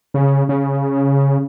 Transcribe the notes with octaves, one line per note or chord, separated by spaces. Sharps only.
C#3
C#3